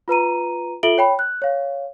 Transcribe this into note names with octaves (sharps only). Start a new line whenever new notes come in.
F4 B4 A#5 D#7
F4 A4 E5 D7 F#7 G7
C#5 G5 B5
F#6
C#5 F5